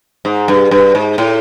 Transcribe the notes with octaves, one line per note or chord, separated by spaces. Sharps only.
G#2
G2
G2
G#2
A2